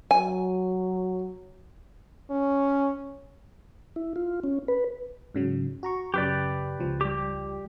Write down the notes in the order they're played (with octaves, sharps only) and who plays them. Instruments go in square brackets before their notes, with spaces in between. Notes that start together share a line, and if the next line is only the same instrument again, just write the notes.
[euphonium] F#3 [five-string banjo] G#5
[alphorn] C#4
[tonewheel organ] E4
F4
C#4
B4
[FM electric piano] G#2 C#3 F#3
F#4 A#5 C#6
[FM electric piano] F#2 C#3 [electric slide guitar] G4 B4 D5
[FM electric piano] C#2 F3
[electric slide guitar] G3 G4